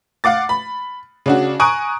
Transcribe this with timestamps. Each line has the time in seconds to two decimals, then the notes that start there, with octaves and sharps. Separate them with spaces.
0.24 F5 F#5 D6 A6
0.49 B5
1.26 C#3 D4 F#4
1.60 G#5 A#5 C#6 D#6 F#6 D7